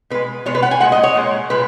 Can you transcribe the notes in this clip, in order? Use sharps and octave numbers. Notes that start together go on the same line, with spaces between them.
B2 G#3 B4
B2 G#3 C#5
B4
F#5
G#5
A#2 G#3 F#5
D#5
C#5
A#2 G#3
A#2 G#3 B4